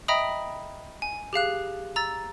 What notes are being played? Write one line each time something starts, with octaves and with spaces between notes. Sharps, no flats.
D#5 E5 G5 A#5 B5 D#6
G#5
G4 G#4 F5 F#6
A#5 E6 A6